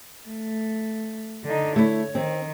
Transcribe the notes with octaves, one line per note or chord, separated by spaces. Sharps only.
A3
D3 D#4
A3 E4 C#5
D#3 C4